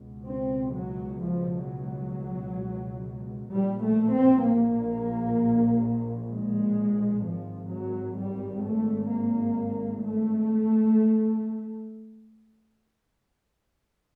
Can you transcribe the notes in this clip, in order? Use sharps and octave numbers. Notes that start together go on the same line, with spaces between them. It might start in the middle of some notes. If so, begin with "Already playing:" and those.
Already playing: C#2 B2
C4
F#3
F3
F#3
A#1 A#2 G3
A3
C4
A#3
G#3
G#1 G#2 F3
F#3
G3
A3
A#3
A3